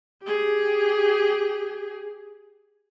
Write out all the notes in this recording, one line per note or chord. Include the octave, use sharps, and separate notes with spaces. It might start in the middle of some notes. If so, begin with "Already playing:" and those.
G4 G#4